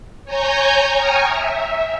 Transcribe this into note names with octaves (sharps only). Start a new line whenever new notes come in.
C#5 G#5 A#5 G6
G5 G#5 A#5 C#6 D#6 F6
E5